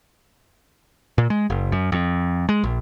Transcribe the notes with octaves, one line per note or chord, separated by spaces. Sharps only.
A#2
G#3
F#1
F#2
F2
G#3
A#1